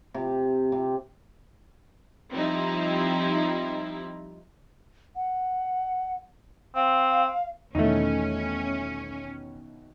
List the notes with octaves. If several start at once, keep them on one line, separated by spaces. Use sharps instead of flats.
C3
C3
F3 G3 C4 D#4 E4
F#5
C4 F5
E2 B2 D#3 A3 C#4 D#4 E4